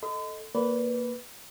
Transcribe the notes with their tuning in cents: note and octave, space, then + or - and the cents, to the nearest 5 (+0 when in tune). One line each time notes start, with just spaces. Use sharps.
A4 +0 D#5 +0 C6 -45
A#3 +0 B4 +0 D5 -25